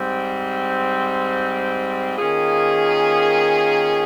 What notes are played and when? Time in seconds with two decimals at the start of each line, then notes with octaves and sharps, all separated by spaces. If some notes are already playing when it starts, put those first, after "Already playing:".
Already playing: G#2 G3 C4
2.17 D#3 A#3 C#4 F4 G#4